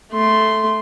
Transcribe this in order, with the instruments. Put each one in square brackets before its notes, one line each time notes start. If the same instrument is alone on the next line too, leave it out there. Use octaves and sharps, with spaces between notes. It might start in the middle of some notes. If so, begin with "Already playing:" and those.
[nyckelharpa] A3 C6